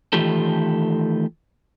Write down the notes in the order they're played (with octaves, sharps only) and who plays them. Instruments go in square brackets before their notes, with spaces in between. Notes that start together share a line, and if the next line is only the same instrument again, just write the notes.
[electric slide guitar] D#3 E3 A3 F4 G4 A4